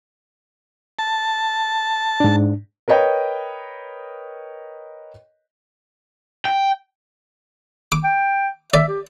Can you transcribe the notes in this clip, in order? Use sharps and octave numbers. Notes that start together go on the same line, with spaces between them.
A5
G#2 D4
A#4 B4 C#5 D#5 G5
G5
D6
G5
D5 E5
G4